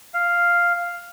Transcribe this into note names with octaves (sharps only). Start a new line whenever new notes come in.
F5